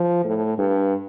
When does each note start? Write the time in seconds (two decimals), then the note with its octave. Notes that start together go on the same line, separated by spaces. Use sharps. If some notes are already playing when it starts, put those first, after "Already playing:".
Already playing: F3
0.24 A2
0.58 G2